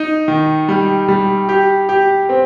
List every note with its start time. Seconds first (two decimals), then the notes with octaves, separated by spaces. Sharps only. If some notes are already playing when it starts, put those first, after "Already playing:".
Already playing: D#4
0.28 D#3
0.69 G3
1.08 G3
1.49 G4
1.89 G4
2.29 C4